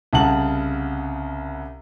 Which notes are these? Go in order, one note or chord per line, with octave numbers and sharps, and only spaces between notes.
C2 C#3 F#5 A5 F#7